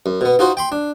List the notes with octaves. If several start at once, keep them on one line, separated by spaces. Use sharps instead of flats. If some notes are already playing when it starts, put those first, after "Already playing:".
F#2
B2 B3
D#4 F4 F#4 C5
G5 B5 C6
D4